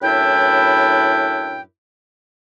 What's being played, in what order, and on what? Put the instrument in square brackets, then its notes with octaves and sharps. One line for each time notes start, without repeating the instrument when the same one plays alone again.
[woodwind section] F#2 A2 D4 E4 B4 G5